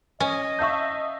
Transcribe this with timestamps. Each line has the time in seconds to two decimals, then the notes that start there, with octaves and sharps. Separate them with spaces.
0.20 C#4 D#5
0.59 E5 F5 A5 C#6 G6